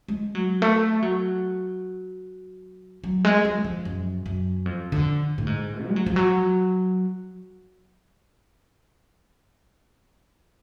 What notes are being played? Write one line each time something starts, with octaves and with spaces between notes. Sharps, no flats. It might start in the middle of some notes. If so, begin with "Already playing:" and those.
G#3
F#3
A3
F#3
F#3
G#3
G#3
D3
F3
F#2
F#2
F2
D3
A2
G#2
G#3
F#3
F3
F#3